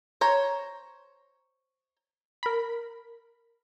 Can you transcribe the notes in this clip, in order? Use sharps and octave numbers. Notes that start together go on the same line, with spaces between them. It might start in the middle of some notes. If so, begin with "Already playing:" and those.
C5 C#5 A#5
A#4 B5